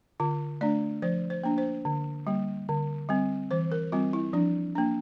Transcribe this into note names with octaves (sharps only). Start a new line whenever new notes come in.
D3 F4
A3 D4 D5
F3 C5
C5
A#3 D4
C5
D3
G3 A#3
D3
G3 C4
E3 C5
A#4
G3 C4 F4
E4
F3 D4
A#3 D4